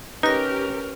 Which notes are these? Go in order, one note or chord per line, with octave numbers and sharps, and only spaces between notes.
C#4 D#4 G4 A#4 B4 A#6